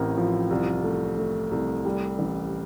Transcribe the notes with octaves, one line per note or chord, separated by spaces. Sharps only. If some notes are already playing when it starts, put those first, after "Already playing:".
Already playing: A1 A2 C4 A#4
F3
C2
A3
A3
C2
G3
A1